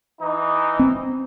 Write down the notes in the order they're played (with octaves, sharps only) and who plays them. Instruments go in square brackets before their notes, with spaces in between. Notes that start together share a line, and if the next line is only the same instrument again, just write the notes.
[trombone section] E3 D#4
[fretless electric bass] C4